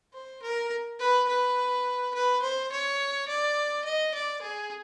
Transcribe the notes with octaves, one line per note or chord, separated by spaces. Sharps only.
C5
A#4
B4
B4
B4
C5
C#5
D5
D#5
D5
G#4